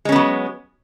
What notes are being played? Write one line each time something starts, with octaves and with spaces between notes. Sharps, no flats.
F#3 G#3 B3 C#4